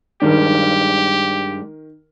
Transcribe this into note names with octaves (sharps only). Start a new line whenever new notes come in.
G2 D#3 G#3 D4 G4 A#4